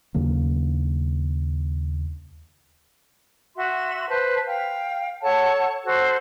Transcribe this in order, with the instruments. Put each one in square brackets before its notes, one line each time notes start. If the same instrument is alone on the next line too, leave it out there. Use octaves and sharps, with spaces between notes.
[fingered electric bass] D#2 C#3 F#3 A#3
[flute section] F#4 E5 C6
B4 C5 A5
F5 G5
A4 C#5 F#5 A5
F#4 A4 C5